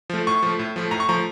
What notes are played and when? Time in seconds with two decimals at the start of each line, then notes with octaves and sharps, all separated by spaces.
0.10 F3 A3
0.27 A2 C#6
0.42 F3 A3
0.59 A2
0.76 F3 A3
0.91 A2 A#5
1.00 C#6
1.09 F3 A3 A#5